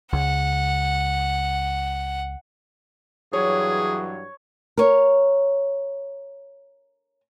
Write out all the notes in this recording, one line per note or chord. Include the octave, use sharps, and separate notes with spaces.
C#2 F#5
G2 E3 F#3 G#4 C#5
A#4 C#5